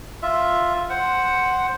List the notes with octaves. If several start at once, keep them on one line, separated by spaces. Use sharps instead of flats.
F4 E5
C5 F#5